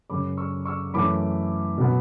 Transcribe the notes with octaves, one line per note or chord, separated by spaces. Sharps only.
F#2 C#3 G#3 C#4 B5 D6
C#6 E6
C#6 E6
F#2 E3 A3 C#4 B5 D6
B2 F#3 B3